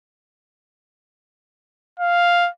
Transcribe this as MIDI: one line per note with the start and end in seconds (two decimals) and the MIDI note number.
2.00 2.50 77